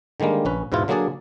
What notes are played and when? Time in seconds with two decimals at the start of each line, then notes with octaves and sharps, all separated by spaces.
0.20 D3 D#3 G3 G#3 A#3
0.45 A#1 C#4 B4
0.72 E2 G#2 B2 E4 F4
0.88 D3 F#3 A#3 D4 G#4 D5